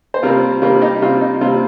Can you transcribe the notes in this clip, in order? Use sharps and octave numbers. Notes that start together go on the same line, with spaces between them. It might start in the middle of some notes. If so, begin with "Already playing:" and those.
C5
C3 G3 C4 F4 A#4
C3 G3 C4 F4 A#4
D#4 G4
C3 G3 C4 F4
D#4
C3 G3 C4 F4